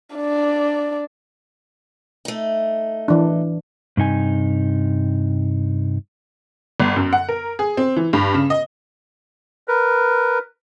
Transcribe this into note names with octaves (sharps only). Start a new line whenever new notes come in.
D4 D5
A3 D#4
E3 D4
G2 C3 D#4 G#5
G1
F#2
F#5
A#4
G#4
C4
E3
G2
C#3
D#5
A#4 B4